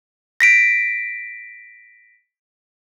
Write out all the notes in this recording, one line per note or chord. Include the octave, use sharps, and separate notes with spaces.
A#6 B6 D7